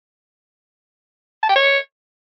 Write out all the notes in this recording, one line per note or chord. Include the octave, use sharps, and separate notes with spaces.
A5
G5
C#5